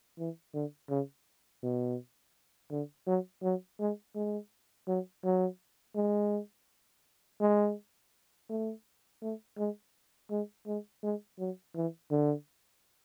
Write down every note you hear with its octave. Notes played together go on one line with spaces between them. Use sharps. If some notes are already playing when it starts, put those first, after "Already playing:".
E3
D3
C#3
B2
D3
F#3
F#3
G#3
G#3
F#3
F#3
G#3
G#3
A3
A3
G#3
G#3
G#3
G#3
F#3
E3
D3